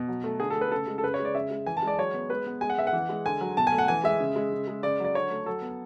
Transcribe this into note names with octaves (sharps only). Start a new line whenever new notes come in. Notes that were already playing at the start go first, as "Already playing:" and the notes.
Already playing: B2
F#3
A3
D3 G#4
A4
A3
B4
C#3 A4
G#3
A4
C#3 B4
C#5
G#3
D5
C#3 E5
G#3
E3 G#5
A5
G#3 D5
F#3 C#5
B3
G#3 B4
B3
G#3 G#5
F#5
B3 E5
F#5
E3
G#3
D3 G#5
F#3
B2 A5
G#5
A3
F#5
E3 G#5
G#3 E5
C#3
G#3
C#3
G#3
C#3 D5
F#3 D5
D3 C#5
A3
F#3 A4
B3